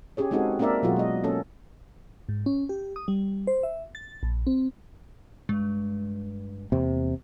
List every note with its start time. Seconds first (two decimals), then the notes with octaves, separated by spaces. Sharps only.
0.17 C#4 G4 G#4 C#5
0.31 G#3 C4 D#4 F#4 G#4 A4
0.59 A#3 C4 D4 A#4 D5 E5
0.83 B2 F#3 F4 F#4 G#4
0.96 G#3 D#5
1.24 A#3 C#4 A4
2.29 G#2
2.46 C#4
2.69 G4
2.96 D#6
3.08 G3
3.47 C5
3.63 E5
3.95 A6
4.23 A#1
4.47 C4
5.49 G2 G#3
6.72 E2 C3 A#3